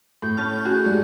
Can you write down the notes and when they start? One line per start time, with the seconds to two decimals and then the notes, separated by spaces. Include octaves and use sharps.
0.22 A2 G6
0.37 C#4 A5 F6
0.65 F#4 G#4
0.85 G#2 G3 D5